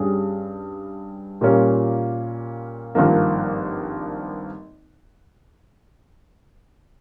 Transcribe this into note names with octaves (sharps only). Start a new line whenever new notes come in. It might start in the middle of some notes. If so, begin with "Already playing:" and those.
Already playing: G2 G3 C#4 G#4
A#2 G3 A#3 C#4 F4
G#1 G2 F3 A#3